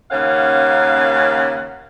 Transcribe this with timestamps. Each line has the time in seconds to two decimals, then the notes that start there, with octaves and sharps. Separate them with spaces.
0.11 D#2 C#3 C#4 A#4 F5 F#5